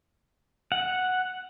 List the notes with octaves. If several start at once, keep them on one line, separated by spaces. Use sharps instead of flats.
F#5